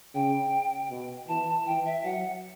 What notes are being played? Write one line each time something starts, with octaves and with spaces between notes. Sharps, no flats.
C#3 G5
B2
E3 A5
E3 G5
E5
F#3 F#5